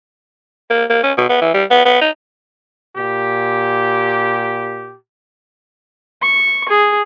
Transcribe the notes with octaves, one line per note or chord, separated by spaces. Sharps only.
A#3
A#3
C#4
B2
B3
E3
G3
B3
B3
D#4
A#2 G4
C#6
G#4